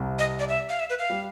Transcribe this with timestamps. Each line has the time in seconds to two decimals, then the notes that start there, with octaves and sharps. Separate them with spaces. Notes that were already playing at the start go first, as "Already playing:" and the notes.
Already playing: C2 C3
0.19 D#5
0.39 D5
0.49 E5
0.69 F5
0.80 E5
0.90 B4
0.99 F5
1.10 G3